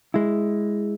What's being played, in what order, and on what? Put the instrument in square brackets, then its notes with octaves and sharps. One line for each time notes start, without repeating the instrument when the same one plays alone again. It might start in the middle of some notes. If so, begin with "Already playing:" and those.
[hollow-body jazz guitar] G#3 E4